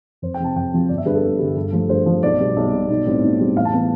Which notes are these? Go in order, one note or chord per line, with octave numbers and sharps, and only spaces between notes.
F2 C5
G5
C3 F3 C4 A5
F2 G5
C3 F3 C4
G1 D5
E5
G2 D3 G3 B4
A4
G1
G2 D3 G3
G2
F3 A3
G2 C5
F3 A3
B1 D5
B2 G3 B3
B1
B2 G3 B3
B1
A2 G3 C4
B1
A2 G3 C4
A1 F5
A5
E3 B3